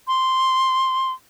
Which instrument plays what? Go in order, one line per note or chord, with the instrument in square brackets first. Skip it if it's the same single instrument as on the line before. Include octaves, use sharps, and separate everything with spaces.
[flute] C6